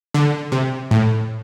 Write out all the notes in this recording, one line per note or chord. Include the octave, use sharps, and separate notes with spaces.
D3
C3
A2